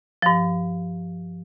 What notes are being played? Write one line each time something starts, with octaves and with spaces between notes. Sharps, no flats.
G2 F3